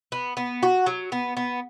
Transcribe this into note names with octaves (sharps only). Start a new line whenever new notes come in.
B3
B3
F#4
F#3
B3
B3